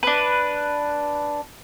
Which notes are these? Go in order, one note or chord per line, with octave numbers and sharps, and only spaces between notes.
D4 B4